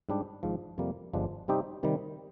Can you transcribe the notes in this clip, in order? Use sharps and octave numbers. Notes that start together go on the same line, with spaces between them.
G#2 G3 D4 G4
G#1 G#2 F3
F2 C3 G3 A#3
G1 G2 F3 G#3 D4
C3 G3 C4 D#4 G4
C3 D#3 G3